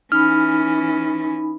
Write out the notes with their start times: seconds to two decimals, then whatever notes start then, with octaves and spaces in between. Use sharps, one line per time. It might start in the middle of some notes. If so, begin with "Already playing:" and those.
0.12 E3 C#4 D#4 B5 F6